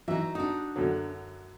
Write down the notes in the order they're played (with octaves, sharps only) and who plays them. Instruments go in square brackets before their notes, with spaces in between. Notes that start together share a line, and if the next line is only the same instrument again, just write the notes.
[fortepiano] E3 E5 [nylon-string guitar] F#3 D#4
[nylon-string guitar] D4 F#4 [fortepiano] D#4
[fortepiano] F#2 D3 F#3